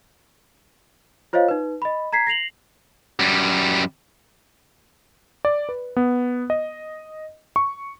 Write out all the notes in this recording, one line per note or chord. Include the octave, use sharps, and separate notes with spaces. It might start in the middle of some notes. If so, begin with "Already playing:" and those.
F4 C5 C#5 D#5 F5
D#4 B4
D#5 B5
A#5 G#6 B6 C7
A#6 C7 F7 F#7
F#2 G3
D5
B4
B3
D#5
C#6